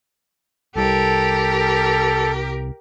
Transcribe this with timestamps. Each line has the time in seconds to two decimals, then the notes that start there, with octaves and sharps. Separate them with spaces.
0.76 C2 G4 A4 A#4
1.59 A4